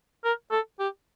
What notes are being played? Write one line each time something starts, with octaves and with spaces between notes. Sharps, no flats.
A#4
A4
G4